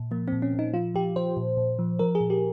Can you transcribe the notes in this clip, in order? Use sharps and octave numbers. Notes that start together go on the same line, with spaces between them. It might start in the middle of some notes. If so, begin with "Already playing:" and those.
Already playing: A#2
F3 A#3
A#2 C4
C#4
A#2
D#4
F3 F4
F3 G4
F3 C5
A#2
A#2
F3
F3 A#4
G#4
A#2
G4